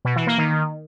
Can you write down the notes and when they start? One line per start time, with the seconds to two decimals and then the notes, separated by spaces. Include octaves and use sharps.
0.05 B2
0.16 E3
0.27 A#3
0.38 D#3